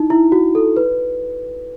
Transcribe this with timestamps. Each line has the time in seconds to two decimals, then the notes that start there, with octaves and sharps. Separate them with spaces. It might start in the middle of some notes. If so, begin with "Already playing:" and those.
Already playing: D#4 E4
0.10 E4
0.32 F#4
0.55 A4
0.77 B4